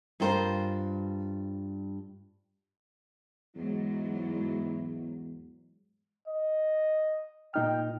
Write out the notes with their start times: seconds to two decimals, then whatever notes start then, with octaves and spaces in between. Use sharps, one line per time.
0.20 G2 F4 A#4 C5
3.56 E2 G#2 F#3 E4
6.27 D#5
7.54 A#2 D#4 G5 F6